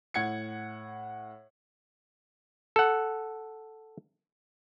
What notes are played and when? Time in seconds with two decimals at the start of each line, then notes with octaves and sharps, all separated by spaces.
0.14 A2 F#5 G#6 C#7
2.76 A4 F#5